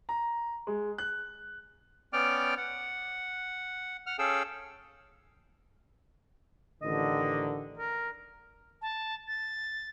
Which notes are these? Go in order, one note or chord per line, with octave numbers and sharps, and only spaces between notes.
A#5
G#3
F#6
B3 C#4 D5 G5 D6 F6
F#5
F#5 F6
C#4 G#4 A4 F5 G5 E6
A1 D3 D#3 D#5
A#4
A5
A6